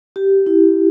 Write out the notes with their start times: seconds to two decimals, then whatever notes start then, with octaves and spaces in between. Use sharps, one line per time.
0.16 G4
0.46 E4